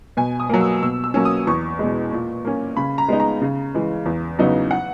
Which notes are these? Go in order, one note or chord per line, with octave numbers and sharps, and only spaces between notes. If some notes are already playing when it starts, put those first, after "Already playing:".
B2 G#5
D#6
F#3 A#3
E6
B2 E6
E6
F#3 A#3 C#4
D#6
E2 C#6
B2 G#3
A#2
A#3 C#4
C#3 B5
A#5
G#3 B3 D#4
A#5
C#3
E3 G#3
E2
C#3 F#3 B3 D#4
F#5